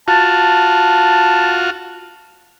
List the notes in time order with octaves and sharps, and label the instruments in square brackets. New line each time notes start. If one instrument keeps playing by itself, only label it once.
[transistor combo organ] F4 F#4 [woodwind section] A5